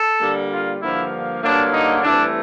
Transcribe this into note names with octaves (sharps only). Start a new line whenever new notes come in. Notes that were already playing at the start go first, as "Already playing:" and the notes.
Already playing: A4
D3 G3 A#3
F4
G2 D3 F3 A#3 E4
G2 D3 F#3 A#3 D4
D#4
G2 E3 A3 C4 D4